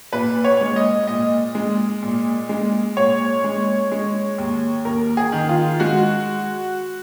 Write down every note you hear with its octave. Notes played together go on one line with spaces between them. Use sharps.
A#2 B4
C#5
G#3
D#5
A#2 D#5
G#3
A#2
G#3
A#2 C#5
G#3
G#3
D#2
D#2 A#4
G#4
D#3
F4
G#3 F#4